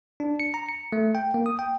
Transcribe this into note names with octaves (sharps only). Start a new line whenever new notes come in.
D4
C#7
A#5
C#7
A3
G5
A#3
D#6
G5